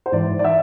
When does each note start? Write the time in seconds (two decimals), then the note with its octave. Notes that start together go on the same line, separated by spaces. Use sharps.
0.06 C5
0.12 G#2 E3 D5
0.39 D5
0.44 E5